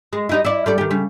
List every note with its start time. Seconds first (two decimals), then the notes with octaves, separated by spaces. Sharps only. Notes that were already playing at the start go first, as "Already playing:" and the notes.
0.13 G#3
0.29 G3 D#4 E4
0.45 E4 D5
0.66 G3 A4 D5
0.78 D#3 G4
0.91 C#3 G3